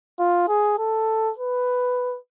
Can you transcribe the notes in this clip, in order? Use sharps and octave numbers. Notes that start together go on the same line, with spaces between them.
F4
G#4
A4
B4